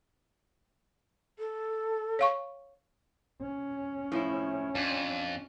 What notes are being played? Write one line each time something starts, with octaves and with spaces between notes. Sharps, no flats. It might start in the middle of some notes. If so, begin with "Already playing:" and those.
A4
C#5 F5 C#6
C#4
A2 F3 E4
F2 D4